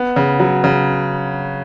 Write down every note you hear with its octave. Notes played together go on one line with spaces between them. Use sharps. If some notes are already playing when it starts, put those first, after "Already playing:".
Already playing: B3
C#3
F#3
C#3